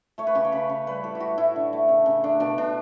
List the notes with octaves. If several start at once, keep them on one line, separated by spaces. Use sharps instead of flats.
A3 C#5
B4
C#3 G4
C#5
C#3 B4
C#3
G3 B4
A2 A4
G4
A2 F#4
A2 E4
D3
A3
C#3
C#3
A3 D4
B2 D4
B2 D4